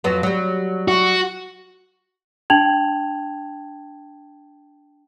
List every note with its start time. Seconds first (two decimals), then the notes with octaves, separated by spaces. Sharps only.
0.04 F2 F#3 B3
0.23 F#3 G3
0.88 F#4
2.50 D4 G5 A5 G#6 F7 F#7